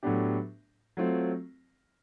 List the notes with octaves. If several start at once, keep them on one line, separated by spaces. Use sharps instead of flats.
A2 F#3 B3 D4 G4
F#3 A3 C4 F4